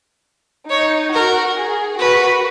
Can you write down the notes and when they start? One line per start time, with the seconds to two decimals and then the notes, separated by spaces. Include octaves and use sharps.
0.69 D#4 C#5
1.13 F#4 A#4
1.56 G#4
1.99 F#4 A#4 B4